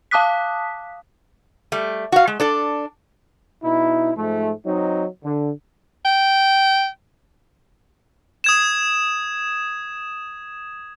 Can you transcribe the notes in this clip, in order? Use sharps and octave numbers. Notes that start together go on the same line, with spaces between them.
F5 A5 D6 D#6 F#6 B6
G3 A3
F#4 F5
G#3
D4 A4 D5
B2 D#4 E4
G#2 F3 A3
F#3 C4 D#4
D3
G5
D#6 G#6 E7